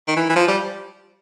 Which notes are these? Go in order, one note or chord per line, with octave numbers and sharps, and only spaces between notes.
D#3
E3
E3
F3
G3